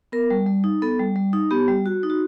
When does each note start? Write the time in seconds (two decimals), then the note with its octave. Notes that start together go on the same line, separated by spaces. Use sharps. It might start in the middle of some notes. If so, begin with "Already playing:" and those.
0.12 B3 A#4
0.30 G3
0.46 G3
0.64 D#4
0.82 B3 A4
0.99 G3
1.16 G3
1.33 D#4
1.51 B3 G4
1.68 G3
1.86 F#4
2.03 D#4
2.10 F#4